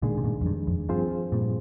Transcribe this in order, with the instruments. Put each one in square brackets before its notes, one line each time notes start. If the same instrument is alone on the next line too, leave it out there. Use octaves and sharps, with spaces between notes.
[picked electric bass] A#2 D3 [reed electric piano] D#3 G#3 D4 G#4
[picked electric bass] C3
G2 A#2
F2
G2
F2
[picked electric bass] G2 [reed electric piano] F3 C4 F4 G#4 C5
[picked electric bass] G2 A#2